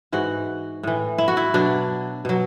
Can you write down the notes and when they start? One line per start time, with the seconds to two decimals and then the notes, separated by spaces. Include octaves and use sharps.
0.12 G#2 E3 F#4
0.83 A2 E3
1.18 E4
1.28 F#4
1.37 E4
1.54 B2 F#3 D4
2.25 B2 F#3